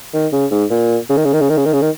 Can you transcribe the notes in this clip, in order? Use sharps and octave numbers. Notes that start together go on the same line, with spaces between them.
D#3
C#3
G#2
A#2
C#3
D#3
C#3
D#3
C#3
D#3
C#3
D#3
C#3
D#3